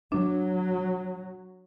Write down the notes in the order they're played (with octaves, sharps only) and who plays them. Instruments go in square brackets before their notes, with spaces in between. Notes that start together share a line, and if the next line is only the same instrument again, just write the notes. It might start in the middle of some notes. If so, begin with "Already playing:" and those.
[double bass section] F#3 [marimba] D4